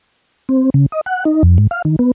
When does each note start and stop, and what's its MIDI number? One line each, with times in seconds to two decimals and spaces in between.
0.49 0.70 60
0.74 0.86 49
0.92 1.01 75
1.06 1.24 78
1.25 1.43 63
1.43 1.58 41
1.58 1.67 44
1.71 1.82 77
1.85 1.96 51
1.99 2.11 59